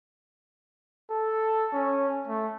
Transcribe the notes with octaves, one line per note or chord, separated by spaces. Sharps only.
A4
C#4
A3